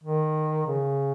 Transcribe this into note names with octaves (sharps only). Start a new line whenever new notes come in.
D#3
C#3